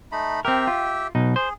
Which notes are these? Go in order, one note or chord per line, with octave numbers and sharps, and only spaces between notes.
A3 D#4 B5
C4 G4 A#4 E5 G5
F4
B1 B2 D#4
G#4 C5